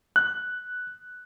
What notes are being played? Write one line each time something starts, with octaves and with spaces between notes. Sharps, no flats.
F#6